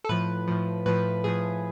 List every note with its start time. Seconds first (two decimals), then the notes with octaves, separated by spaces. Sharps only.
0.04 A4
0.09 A2 F3 B4
0.47 A2 F3
0.86 A2 F3 B4
1.24 A2 F3 G#4